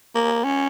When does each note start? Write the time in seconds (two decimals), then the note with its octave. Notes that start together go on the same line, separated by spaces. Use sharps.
0.15 A#3
0.44 C#4